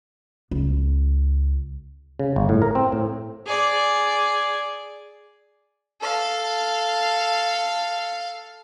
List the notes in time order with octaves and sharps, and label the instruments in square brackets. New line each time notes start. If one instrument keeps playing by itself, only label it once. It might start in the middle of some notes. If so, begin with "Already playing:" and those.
[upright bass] C#2
[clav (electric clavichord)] C#3
G1
A2
A#4
C4
A2
[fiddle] G#4 D5
[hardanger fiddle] A4 F5